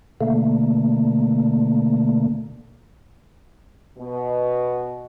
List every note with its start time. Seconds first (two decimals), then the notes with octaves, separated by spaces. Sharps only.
0.21 B2 D3 A3 A#3
3.98 B2